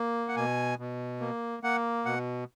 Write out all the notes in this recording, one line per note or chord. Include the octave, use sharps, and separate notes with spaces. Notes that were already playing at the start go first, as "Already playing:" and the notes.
Already playing: A#3
F#5
B2 G#5
B2
A#3
A#3 F#5
B2 F#5